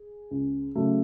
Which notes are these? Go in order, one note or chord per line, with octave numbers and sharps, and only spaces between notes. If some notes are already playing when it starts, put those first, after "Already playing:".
Already playing: G#4
C#2
C#3 F#3 A3